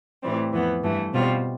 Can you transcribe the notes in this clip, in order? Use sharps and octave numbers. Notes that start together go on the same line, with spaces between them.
A2 E3 G3 C4
F2 E3 B3
G2 E3 A3
B2 G3 C4 F4